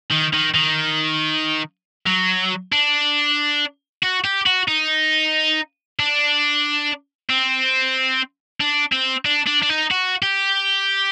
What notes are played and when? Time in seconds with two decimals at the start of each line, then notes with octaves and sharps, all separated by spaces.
0.11 D#3
0.33 D#3
0.54 D#3
2.06 F#3
2.72 D4
4.03 F#4
4.24 G4
4.46 F#4
4.68 D#4
5.99 D4
7.30 C4
8.61 D4
8.92 C4
9.25 D4
9.46 D4
9.62 D4
9.69 D#4
9.91 F#4
10.23 G4